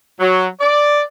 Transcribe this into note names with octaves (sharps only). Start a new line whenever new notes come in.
F#3
D5